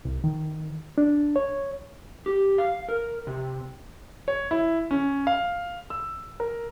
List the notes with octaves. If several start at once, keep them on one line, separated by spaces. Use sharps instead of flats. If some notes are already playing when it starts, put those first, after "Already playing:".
C2
D#3
D4
C#5
G4
F5
A#4
C3
C#5
E4
C#4
F5
E6
A#4